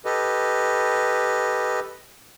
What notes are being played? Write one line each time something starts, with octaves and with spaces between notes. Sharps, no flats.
G4 A4 B4 D#5